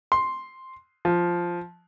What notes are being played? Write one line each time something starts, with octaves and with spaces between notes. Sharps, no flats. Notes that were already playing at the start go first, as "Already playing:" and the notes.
C6
F3